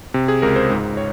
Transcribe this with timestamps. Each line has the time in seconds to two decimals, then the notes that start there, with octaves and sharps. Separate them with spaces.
0.14 C3
0.28 G#4
0.42 C#2 A#4
0.56 C5
0.70 G#2
0.97 C#5